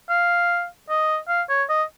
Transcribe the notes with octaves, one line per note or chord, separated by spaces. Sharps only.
F5
D#5
F5
C#5
D#5